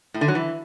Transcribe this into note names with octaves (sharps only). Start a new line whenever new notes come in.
A2
D3
F#3
E3